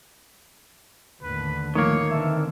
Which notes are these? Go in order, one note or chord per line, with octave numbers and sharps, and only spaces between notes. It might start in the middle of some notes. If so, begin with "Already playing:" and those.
D#2 A2 D3 B4
D#3 F3 A3 A#3 C#5
D3 E3 C4 A4 E5